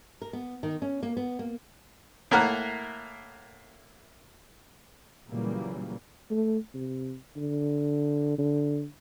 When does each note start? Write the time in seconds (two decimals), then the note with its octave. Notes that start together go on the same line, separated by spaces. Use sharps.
0.22 A#4
0.33 B3
0.63 D#3
0.82 C#4
1.03 A#3
1.17 B3
1.39 A#3
2.31 A2 A#3 A#4 F#5
5.28 A#2 C#3 E3 F#3 G3 A#3
6.31 A3
6.74 C3
7.37 D3
8.38 D3